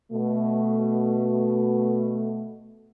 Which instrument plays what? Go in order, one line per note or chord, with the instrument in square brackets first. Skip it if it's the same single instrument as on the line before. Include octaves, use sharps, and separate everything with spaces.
[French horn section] B2 A3